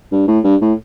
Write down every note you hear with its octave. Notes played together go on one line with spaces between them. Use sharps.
G2
A2
G2
A2